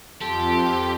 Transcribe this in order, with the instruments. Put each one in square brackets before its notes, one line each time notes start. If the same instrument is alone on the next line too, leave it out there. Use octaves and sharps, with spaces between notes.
[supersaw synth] F2 [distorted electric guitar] G4 [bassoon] A4 [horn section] C6